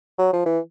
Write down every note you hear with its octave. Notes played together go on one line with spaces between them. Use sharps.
F#3
F3
E3